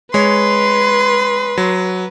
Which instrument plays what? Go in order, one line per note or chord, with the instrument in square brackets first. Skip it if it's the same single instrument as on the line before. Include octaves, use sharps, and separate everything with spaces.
[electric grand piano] G#3 C#5 [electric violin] B4 [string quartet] C6
[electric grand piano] F#3